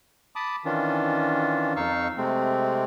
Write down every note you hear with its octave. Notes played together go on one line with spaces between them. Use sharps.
A5 B5 D6 D#6
D#3 E3 C#4 D4 F4
F2 D#4 F5 C#6 E6
C3 G#3 A3 C4